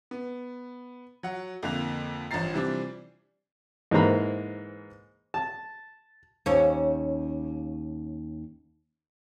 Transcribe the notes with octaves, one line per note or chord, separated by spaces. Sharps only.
B3
F#3 F#5
F2 D3 A#3 F#6 F7
A1 G2 F3 A#5 A6 C7
C3 E3 F3 G3 C4 D4
G#2 E3 A#3 C5 A#5 B5
A5
D#2 C#4